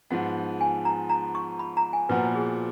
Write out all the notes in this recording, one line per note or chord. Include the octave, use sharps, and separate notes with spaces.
G#2 F3 B3 F#5
G#5
A#5
A#5
C#6
B5
A#5
G#5
A#2 F3 B3 F#4 B4
G#4